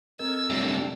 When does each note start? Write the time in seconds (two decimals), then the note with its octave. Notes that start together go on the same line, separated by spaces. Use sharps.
0.19 C4 A4 A#4 D#5 E6 G#6
0.50 F#2 C3 G3 A3 D4 F4